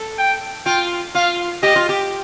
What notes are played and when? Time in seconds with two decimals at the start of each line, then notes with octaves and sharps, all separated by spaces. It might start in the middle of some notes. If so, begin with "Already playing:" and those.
Already playing: A4
0.18 G5
0.66 F4 G5
1.15 F4 F5
1.63 G4 D#5
1.76 F4
1.89 G4